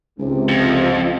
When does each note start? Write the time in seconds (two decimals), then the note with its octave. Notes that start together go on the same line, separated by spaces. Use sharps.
0.19 C#2 G#2 C3
0.49 F2